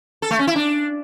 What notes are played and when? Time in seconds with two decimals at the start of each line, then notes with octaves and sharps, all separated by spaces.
0.22 A4
0.31 A3
0.39 C#4
0.47 E4
0.56 D4